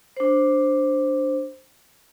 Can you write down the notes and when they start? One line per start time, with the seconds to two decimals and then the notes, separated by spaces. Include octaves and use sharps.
0.17 D4 C5